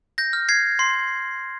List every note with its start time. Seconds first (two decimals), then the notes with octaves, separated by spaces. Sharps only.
0.18 G6 A#6
0.33 F6
0.49 G#6 C7
0.79 C6 C7